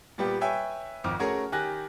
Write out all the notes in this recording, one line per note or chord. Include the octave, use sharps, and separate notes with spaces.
A#2 G3 B3 G4
B4 C#5 E5 G5 G#5
G#1 F2 D6 F6
A3 C#4 F#4 G#4 A#4 C#5
D#3 G4 G#5 F#6 A#6